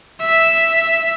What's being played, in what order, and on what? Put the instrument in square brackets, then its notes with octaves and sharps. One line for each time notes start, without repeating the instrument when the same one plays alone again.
[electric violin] E5